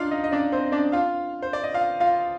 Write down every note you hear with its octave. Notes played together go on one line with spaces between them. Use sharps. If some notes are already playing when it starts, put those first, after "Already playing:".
Already playing: D4 D#4 F4 D5 F5
D#4 D#5
D#5
D4 D5
C4 C5
D4 D5
F4 F5
C5
D5
D#5
F4 F5
F4 F5